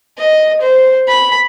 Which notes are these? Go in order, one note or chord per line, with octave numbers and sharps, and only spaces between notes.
D#5
C5
B5